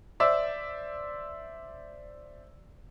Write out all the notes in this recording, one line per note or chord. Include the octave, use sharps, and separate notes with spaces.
C5 D5 E5 E6